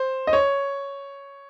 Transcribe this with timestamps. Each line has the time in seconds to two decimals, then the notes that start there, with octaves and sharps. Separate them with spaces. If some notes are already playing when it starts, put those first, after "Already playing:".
Already playing: C5
0.27 D#5
0.33 C#5